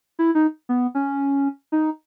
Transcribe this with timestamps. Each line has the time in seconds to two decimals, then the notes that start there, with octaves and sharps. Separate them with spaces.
0.19 E4
0.35 D#4
0.69 B3
0.95 C#4
1.72 D#4